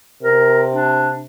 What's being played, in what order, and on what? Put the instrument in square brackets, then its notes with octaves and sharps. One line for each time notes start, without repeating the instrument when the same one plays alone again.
[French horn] C3 [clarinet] A#4
[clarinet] D4